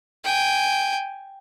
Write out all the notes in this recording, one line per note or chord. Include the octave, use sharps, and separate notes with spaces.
G5 G#5